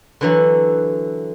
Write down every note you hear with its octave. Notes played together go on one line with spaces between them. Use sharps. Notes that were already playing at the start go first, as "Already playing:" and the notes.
D3 E3 F#3